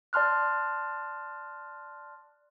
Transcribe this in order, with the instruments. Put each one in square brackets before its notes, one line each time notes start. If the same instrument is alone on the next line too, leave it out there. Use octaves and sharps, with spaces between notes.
[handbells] D5 A5 C6 F6 F#6